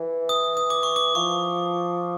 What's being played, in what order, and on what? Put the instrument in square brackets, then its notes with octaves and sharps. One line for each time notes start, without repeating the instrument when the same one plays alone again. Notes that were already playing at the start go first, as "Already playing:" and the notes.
Already playing: [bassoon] E3
[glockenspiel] D#6
D#6
D6
C#6
D6
[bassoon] F3 [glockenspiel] C#6